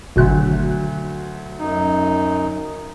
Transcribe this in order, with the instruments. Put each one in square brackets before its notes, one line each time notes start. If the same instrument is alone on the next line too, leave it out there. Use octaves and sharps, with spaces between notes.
[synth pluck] G#1 B2 F#6 [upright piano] D2 F#3
[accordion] F#2 D#4